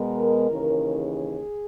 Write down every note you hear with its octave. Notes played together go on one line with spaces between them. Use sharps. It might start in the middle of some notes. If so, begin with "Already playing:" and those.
Already playing: B2 G#3 B3 A#4
D#2 C#3 E3
G#4